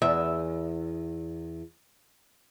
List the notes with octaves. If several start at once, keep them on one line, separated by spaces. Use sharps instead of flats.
E2 E5